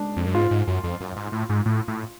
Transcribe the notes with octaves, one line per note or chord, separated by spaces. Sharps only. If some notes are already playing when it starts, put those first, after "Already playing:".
Already playing: G#3 D4
F2
F#2
G#2 F4
G#2
F#2
F2
F#2
G#2
A2
G#2
A2
A2